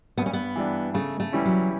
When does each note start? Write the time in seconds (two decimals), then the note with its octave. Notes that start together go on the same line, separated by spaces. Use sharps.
0.17 G2 B3
0.26 C#4
0.33 B3
0.56 E3 G3 D4
0.94 C#3 A3
1.20 A3
1.32 E3 G3 C#4 E4
1.45 F#3